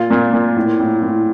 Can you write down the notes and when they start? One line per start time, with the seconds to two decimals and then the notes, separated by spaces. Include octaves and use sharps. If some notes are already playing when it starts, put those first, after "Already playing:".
Already playing: A#2 F4
0.10 A#2
0.33 A#2
0.56 A2
0.80 A2
1.02 A2